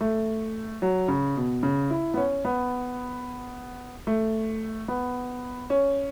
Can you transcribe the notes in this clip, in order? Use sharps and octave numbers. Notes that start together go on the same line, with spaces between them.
A3
F#3
C#3
B2
C#3
E4
B3
C#4
B3
A3
B3
C#4